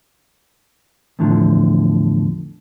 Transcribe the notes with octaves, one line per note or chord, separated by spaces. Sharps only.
E2 A2 D3 F3